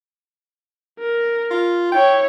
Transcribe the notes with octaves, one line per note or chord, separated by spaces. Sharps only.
A#4
F4
E4 C#5 G5